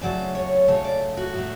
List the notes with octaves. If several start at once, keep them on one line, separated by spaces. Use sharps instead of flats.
C#3 F#3 A3 D5
C#5
C#3 F#3 A3 C#5
D5
F#4
A2 F#3 A3